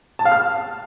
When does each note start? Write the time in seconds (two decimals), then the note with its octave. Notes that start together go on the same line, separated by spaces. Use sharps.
0.19 A5
0.25 F5
0.32 F6